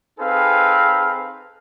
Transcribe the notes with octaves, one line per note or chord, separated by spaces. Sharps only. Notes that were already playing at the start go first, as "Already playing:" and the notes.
C4 D#4 G#4 A4 B4 F5